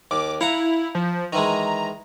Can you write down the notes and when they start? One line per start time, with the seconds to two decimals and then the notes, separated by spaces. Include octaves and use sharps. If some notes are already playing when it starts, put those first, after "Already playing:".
0.11 D#2 D6
0.41 E4 F5 F#5 A#5
0.95 F3
1.33 D#3 E3 G#3 A#5